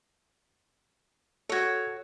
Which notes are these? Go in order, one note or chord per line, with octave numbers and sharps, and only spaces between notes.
F#4 A4 C#5 G#6